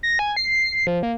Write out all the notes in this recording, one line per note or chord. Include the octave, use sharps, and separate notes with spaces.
A#6
G#5
C7
C7
F3
A#3